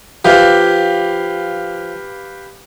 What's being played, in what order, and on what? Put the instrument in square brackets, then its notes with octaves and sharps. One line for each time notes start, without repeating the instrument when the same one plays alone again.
[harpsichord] F3 [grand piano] G4 B4 F5